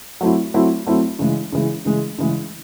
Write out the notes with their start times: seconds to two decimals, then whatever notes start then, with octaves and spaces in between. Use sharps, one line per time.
0.21 F#3 A3 C4 E4
0.54 F#3 A3 C4 E4
0.86 F#3 A3 C4 E4
1.19 C#3 E3 G#3
1.52 C#3 E3 G#3
1.85 C#3 E3 G#3
2.18 C#3 E3 G#3